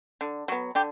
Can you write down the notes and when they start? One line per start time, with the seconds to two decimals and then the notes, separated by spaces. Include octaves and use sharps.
0.21 D3
0.48 F#3 B3
0.75 D3 G4